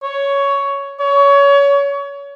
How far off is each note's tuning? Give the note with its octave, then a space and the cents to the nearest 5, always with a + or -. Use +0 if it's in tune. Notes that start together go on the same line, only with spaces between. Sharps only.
C#5 +10
C#5 +25